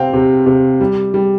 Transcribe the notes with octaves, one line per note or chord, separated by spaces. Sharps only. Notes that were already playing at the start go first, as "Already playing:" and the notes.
Already playing: C3 C4 F5 G5
C3
C3
G3
G3